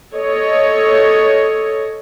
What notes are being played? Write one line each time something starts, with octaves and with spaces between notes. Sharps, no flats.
A4 C#5 D#5